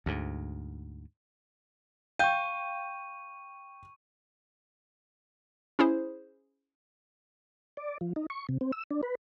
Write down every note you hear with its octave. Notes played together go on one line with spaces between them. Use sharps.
D2 G#2
F5 G5 C#6 G6 D#7
C#4 E4 G#4 C5
D5
F3
D#4
C#6
C3
C4
E6
D4
B4